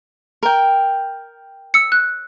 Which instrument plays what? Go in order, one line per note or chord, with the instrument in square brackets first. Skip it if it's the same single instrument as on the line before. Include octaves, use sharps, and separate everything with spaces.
[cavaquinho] A#4 G5
[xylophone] E6 C#7
F#6